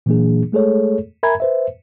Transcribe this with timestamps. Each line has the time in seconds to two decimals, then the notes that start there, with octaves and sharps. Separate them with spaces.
0.06 A#2 E3 F#3 A#3 D4 G#4
0.52 G#3 A3 G#4 A4 C#5
1.23 A#4 E5 G#5 A#5 B5 G#6
1.40 B4 C5 E5